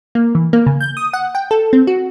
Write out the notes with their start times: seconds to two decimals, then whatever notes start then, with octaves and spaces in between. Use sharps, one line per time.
0.15 A#3
0.35 E3
0.53 A#3
0.66 C#3
0.81 G6
0.97 D#6
1.13 F#5
1.35 G5
1.51 A4
1.73 C4
1.87 F#4